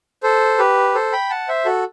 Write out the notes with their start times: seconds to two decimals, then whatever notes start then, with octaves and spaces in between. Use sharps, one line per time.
0.23 A4 C5
0.58 G4 B4
0.95 A4 C5
1.12 G5 B5
1.30 F#5 A5
1.48 C5 E5
1.65 F#4 A4